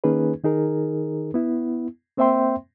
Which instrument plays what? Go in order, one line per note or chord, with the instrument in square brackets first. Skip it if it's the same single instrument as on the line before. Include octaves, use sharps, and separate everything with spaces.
[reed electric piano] D#3 A#3 C#4 D#4 G#4 B4
D#3 D#4 G#4 A#4
B3 E4
A#3 C4 C5 E5 G5 C6